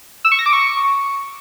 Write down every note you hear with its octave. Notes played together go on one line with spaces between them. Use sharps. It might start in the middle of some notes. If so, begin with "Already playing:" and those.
E6
C#6
A#6
D6
C#6